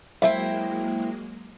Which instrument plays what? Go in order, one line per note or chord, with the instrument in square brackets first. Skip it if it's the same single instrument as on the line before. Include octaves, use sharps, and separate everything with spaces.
[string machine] F#3 G#3 A#3 [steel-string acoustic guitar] E4 C5 G5 [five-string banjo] E5 F5